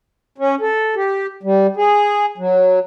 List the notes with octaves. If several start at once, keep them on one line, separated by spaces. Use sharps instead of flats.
C#4
A4
G4
G3
G#4
F#3